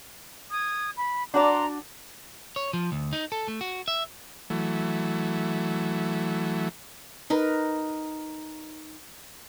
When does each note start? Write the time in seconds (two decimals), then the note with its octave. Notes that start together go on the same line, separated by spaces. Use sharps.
0.51 D#6 G#6
0.96 B5
1.34 D4 F#4 D5 A#5 C6
2.56 C#5
2.73 F3
2.92 D2
3.13 D#4
3.32 A4
3.48 A3
3.61 F#4
3.88 E5
4.50 E3 F#3 A3
7.30 D#4 A#4 B4